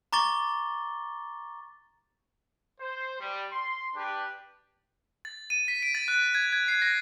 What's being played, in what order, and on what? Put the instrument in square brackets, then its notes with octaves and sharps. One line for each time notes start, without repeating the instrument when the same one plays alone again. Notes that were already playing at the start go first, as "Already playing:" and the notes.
[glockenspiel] A#5 C#6 D6 A6 G7
[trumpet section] C5
G3
C6
D4 G4 B4
[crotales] A6
D#7
B6
D7
A6
F#6
G#6
G#6
C7
A#6